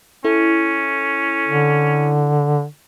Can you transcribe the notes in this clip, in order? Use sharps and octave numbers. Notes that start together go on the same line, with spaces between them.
C#4 E4 A4
D3